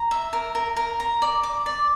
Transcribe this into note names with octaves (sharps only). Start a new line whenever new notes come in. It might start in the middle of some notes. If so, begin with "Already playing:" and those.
Already playing: A#5
E5
A#4
A#4
A#4
A#5
D5
D6
D5